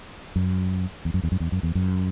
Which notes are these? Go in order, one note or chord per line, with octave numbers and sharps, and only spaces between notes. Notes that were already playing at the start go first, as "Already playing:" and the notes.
F#2
E2
F#2
E2
F#2
E2
F#2
E2
F#2